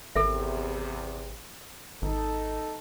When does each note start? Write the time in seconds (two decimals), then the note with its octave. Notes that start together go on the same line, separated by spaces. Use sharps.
0.15 G#1 E2 C3 A4 A#4 E5
2.02 G#1 D#4 A4